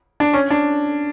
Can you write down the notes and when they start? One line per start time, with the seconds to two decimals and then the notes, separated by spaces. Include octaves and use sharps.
0.20 D4
0.33 C#4
0.50 D4